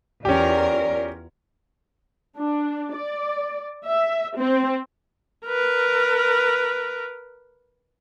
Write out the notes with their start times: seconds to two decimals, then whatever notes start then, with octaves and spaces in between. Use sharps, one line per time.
0.25 E2 C#4 F4 G4 A#4 D5
2.37 D4
2.95 D5
3.85 E5
4.37 C4
5.46 A#4 B4